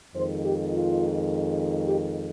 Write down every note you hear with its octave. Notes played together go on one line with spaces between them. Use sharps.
F2 D#3 G#3 C5
G4
F4
G4